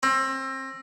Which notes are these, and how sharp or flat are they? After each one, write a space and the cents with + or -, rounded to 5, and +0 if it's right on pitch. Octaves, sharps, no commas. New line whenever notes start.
C4 +30